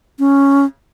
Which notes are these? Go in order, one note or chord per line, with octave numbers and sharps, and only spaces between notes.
C#4